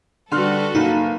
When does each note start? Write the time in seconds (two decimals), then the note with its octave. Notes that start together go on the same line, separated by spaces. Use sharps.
0.32 D3 G3 F#4 A4 B4 C6 F6
0.75 F#1 A#3 D#4